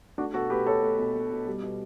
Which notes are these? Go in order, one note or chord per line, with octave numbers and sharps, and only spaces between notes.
A3 D4 F#4
B2 F#4 A4
A3 G4 B4
B2 A4 C#5
A3
B2
A3
B2
G3
B2